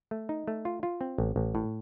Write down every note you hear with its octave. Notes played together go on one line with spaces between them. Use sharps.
A3
D#4
A3
F4
F4
C4
A1
A1
A2